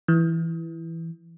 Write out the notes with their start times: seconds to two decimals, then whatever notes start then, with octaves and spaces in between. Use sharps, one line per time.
0.08 E3